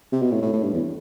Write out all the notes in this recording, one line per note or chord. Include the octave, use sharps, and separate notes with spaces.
C3
B2
A2
A2
A2
G2
E2